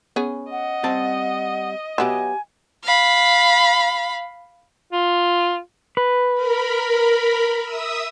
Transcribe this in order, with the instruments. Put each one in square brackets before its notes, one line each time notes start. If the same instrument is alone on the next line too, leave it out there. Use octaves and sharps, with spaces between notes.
[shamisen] B3 C#4 G#4
[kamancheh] D#5 [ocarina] F#5
[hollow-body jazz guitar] G3 C4 A5
[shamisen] F#3 B3 [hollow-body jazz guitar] G4 E5 [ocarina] G#5
[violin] F5 B5
[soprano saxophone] F4
[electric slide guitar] B4
[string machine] A#4 B5
E5 D#6 E6